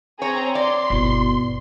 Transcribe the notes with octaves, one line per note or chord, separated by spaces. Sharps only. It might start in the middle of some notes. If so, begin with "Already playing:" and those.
C4 G#4 C#5 A#5
D5 C6
G1 B2 E4